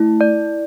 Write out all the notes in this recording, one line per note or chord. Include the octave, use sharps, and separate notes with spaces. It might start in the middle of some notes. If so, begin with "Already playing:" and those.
Already playing: A3 E4
D5